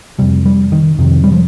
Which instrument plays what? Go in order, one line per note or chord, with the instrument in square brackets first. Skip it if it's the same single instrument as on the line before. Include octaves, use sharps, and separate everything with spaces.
[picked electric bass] F2 C3 G3
G3
D#3
F2 C3 D#3
G3
F3